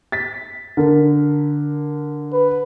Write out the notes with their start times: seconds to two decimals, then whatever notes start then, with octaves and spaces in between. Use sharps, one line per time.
0.12 A6 B6
0.77 D3 A#4
2.33 B4